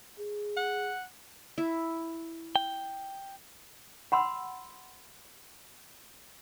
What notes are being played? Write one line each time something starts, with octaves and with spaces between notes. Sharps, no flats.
G#4
F#5
E4
G5
F#5 B5 C6 E6